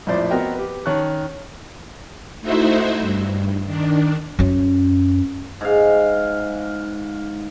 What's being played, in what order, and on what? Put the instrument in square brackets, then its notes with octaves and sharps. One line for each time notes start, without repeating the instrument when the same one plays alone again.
[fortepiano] A#1 F2 A2 C5 D5
B3 C4 F#4 A#4 D#5 G5
G4 B4
D#3 C#4 C#5 A5 C#6 F#6
[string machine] A3 D#4 E4 F#4 C5 E5
G2
D#3 D4
[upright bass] F#2 C#4
[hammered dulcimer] G#2 F5